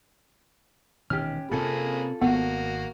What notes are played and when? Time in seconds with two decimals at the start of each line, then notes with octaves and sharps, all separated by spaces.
1.10 E1 D#3 C#4 G4 F6
1.51 C3 A#3 C4 C#4 F4 G#4 A4 B5
2.21 G#1 A#3 B3 F#4